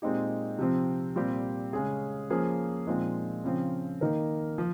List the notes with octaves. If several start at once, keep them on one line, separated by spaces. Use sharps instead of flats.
A#2 G#3 C4 D#4 G4
C3 F3 C4
A#2 G3 C4 G4
C#3 G#3 C#4 G#4
F3 A#3 C#4 G#4 C5
A#2 F3 G#3 C4 D#4
C#3 F3 C4
D#3 A#3 D#4 A#4
F3